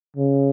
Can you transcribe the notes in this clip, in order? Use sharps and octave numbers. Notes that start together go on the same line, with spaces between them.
C#3